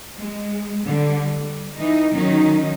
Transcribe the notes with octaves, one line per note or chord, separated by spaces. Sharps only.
G#3
D3 G3
G3
E3 D#4
D#3 F#3 C#4 D#4